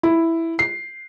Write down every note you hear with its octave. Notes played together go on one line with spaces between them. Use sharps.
E4
C7